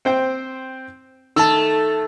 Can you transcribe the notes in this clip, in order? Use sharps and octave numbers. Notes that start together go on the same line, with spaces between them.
C4 C5 G5
D#3 A3 A5 E6